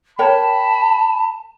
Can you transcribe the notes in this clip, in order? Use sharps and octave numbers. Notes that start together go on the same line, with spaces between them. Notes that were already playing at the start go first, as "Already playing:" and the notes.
A#4 C#5 G5 A5 B5